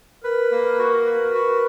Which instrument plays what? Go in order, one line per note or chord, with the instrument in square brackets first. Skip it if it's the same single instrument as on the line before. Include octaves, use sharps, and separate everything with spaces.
[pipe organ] A#4 [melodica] B4
[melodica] A#3
F#4
B4
F#4